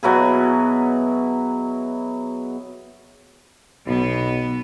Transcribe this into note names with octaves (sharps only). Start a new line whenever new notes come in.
B2 F#3 E4 G#4
B1 B2 B3